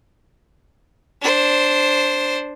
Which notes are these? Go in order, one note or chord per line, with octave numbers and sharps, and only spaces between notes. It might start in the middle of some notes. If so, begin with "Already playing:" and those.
D4 C5